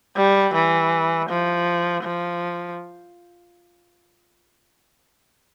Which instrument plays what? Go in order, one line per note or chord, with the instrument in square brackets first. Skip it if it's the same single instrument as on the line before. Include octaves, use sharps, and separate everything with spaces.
[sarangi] G3
E3
F3
F3